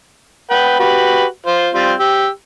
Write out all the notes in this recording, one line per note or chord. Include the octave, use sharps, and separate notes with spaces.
B4 F#5 G5
F#4 G4 B4
F4 C5
G3 C4 F4
G4 E6